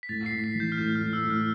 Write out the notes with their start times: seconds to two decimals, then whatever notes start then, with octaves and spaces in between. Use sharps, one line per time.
0.03 B6
0.09 A2 A6
0.26 C7
0.32 A2
0.44 B6
0.55 E3
0.60 G6
0.72 F6
0.78 A2 G6
0.95 F6
1.01 A2
1.13 E6
1.25 A2
1.30 F6